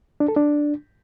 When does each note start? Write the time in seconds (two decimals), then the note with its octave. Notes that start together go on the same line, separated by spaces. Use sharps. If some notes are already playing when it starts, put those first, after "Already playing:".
0.20 D4
0.28 A4
0.36 D4